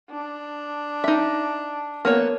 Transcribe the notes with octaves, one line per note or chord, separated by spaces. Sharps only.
D4
D#4 E5
A#3 B3 C#5